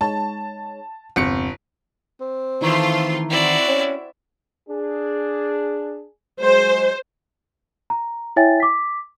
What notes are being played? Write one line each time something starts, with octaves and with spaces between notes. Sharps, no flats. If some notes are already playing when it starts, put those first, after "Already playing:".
G#3 D#4 C#5 A5
G1 E2 C3 C4 C#7
C4
D#3 E3 A3 F4 C6
C4 E4 F#4 D5
C#4
D4 G#4
F#3 G#3 C5
A#5
E4 C#5 E5 G5 G#5 A6
D6 B6